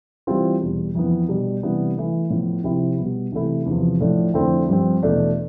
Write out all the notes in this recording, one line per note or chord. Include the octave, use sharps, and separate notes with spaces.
E3 G3 C4 F4
E2 B2 G3
F2 E3 B3
B2 G3 D4
C3 E3 G3 B3 D4
E3 A3 E4
A2 F3 B3 E4
C3 F3 C4 E4
B2 G3 B3
C3 E3 A3 E4
E2 C3 F3
A2 F3 A3 D4
F2 D3 A3 C4 E4
G2 F3 C4
E2 B2 A3 D4